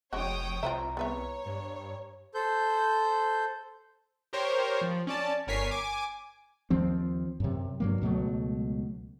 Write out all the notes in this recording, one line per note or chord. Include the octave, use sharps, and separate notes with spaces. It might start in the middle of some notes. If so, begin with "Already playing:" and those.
F1 G#3 D4 F#4 C#5 G5 D#6
C2 F4 C5 E5 A#5
B3 B4 C#5 E5
G2
A4 C5 G6
G4 A#4 C5 C#5
F3
C#4 D5 A5
G1 A#4 C#5 G#5 B6 C7
G#5 D6
D#2 F3 C4
F#2 C3
G2 F#3 A#3
C#2 B2 F#3 A3